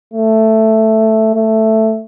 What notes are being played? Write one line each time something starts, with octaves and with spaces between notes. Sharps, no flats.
A3
A3